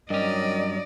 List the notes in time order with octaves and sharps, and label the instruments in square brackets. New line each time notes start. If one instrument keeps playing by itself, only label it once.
[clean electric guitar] G2 C#4 [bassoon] D#3 [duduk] F#3 [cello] D5 D#5